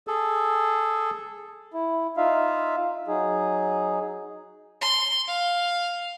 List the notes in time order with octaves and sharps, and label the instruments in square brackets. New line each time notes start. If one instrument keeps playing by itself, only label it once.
[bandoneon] G#4 A4
[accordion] E4
D#4 F4 E5 F5
F#3 D#4 G#4
[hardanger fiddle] C6
F5